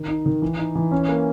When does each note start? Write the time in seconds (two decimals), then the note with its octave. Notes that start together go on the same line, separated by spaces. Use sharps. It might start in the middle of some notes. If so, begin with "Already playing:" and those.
Already playing: D#3
0.08 D#4
0.26 D#3
0.42 E3
0.59 D#4
0.75 E3
0.91 C#4
1.09 A#3